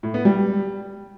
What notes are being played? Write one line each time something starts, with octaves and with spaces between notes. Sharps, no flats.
A2
B3
G3